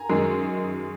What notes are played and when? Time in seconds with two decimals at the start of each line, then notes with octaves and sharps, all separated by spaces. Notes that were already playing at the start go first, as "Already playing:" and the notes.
Already playing: G#5 A#5
0.09 F#2 D#3 G#3